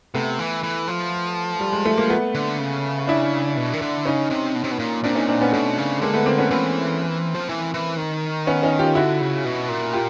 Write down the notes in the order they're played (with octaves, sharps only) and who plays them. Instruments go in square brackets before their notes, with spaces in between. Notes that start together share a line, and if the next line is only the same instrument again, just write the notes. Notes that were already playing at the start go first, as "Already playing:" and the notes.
[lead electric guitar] C3 [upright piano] A3 B3
[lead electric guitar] E3
E3
F3
[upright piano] G3
G#3
A3
A#3
A3 B3
[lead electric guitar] D3
C#3
[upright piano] D4 E4
[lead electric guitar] B2
D#3
D3
[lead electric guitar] C#3 [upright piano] C#4 D#4
[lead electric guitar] C3
B2
C3
B2
A#2
[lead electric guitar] A#2 [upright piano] C4 D4
[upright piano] C#4 D#4
C4 D4
B3 C#4
[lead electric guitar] B2 [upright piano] A3 B3
[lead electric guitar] C#3
[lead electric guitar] D3 [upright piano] G#3 A#3
[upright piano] A3 B3
A#3 C4
B3 C#4
[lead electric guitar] E3 [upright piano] A#3 C4
[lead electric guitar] F3
E3
E3
D#3
[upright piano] B3 C#4
C#4 D#4
F4 G4
[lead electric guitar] D3 [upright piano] E4 F#4
[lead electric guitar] C#3
B2
A#2
[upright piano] F4 G4